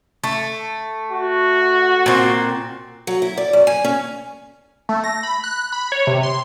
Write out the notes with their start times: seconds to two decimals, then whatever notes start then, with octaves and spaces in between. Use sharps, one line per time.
0.24 A3
1.11 F#4
2.06 A#2 C4
3.07 F#3
3.22 E4
3.37 D5
3.53 F#2
3.67 G#5
3.84 C#4
4.89 A3
5.04 A#6
5.23 B5
5.44 F#6
5.72 B5
5.92 C#5
6.07 C3
6.23 C6